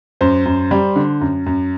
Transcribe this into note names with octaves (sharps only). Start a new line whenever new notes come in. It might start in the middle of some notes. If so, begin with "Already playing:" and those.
F#2 C5
F#2
G3
D3
F#2
F#2